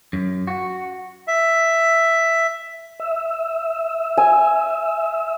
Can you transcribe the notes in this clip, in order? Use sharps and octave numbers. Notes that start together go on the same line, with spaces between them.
F#2
F#4
E5
E5
G#5